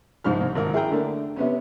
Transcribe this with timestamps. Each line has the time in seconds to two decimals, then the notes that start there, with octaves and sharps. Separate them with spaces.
0.24 C2 G#2 F3 F6
0.41 C2
0.55 G#1 A#4
0.73 E4 G#4 A#4 G5 A#5
0.90 D3 A3 A#3 D4
1.36 C3 B3 C#4